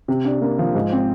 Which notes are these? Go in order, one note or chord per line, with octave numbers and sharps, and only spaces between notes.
C3
D4
A#3
F3
G#2
C4